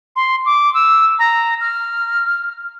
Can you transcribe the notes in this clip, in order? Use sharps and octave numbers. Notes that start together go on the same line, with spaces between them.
C6
D6
E6
A#5
F6